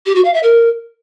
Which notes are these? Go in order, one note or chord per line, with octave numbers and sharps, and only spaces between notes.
G4
F#4
F5
E5
A#4